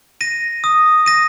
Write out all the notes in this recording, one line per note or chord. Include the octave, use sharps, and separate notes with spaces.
A#6 D#7
D#6
A#6 D#7